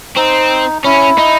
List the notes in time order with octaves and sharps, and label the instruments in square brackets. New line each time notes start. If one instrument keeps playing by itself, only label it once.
[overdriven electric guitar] C4 [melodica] D#4
[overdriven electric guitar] C#4 [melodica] E4
[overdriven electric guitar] D#4